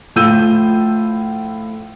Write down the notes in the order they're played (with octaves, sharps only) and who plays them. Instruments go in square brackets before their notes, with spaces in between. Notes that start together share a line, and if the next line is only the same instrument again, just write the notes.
[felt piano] A2 F3 F4 E6 G6 D#7